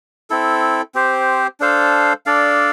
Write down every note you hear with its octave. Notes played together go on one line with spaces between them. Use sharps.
C4 E4 A4
C4 G4 C5
D4 A4 C5 F5
D4 A4 D5 F5